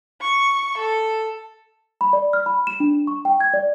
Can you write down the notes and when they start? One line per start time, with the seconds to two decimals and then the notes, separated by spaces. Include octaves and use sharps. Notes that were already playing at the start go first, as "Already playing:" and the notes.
0.20 C#6
0.78 A4
2.01 B5
2.13 D5
2.33 F6
2.46 B5
2.67 E7
2.80 D4
3.07 C#6
3.25 G5
3.40 G#6
3.54 D5